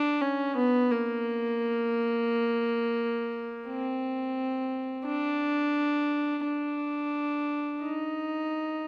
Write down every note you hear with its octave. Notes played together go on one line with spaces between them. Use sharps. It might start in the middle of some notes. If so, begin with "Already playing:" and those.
Already playing: D4
C#4
B3
A#3
C4
D4
D4
D#4